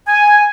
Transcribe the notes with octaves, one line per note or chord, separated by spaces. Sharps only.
G#5